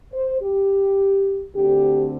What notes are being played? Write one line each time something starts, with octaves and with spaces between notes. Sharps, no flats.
C5
G4
D2 D3 C4 G4